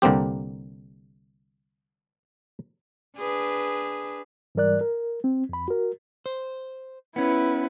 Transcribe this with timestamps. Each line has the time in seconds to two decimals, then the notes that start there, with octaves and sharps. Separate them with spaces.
0.02 C2 D3 A#3 C4 G4
3.17 D4 G#4 B4
4.55 G#2 E3 G3 A#4 D5 F#6
4.81 A#4
5.24 C4
5.49 F2 B5
5.68 F#4 A#4
6.26 C5
7.16 B3 C#4 E4 B4